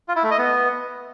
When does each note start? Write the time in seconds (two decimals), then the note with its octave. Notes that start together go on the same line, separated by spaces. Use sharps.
0.08 F4
0.16 E4
0.23 A3
0.31 D#5
0.38 B3